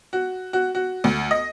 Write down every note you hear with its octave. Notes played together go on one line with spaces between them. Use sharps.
F#4
F#4
F#4
D2
D#5